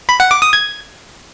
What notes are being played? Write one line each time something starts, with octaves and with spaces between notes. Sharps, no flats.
B5
F#5
D6
D#6
G#6